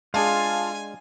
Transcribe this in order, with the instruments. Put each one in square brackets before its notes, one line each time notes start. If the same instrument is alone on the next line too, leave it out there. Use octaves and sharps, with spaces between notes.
[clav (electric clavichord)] G#3 D4 G#4 [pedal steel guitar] F4 [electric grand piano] F5 A5 [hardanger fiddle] G#5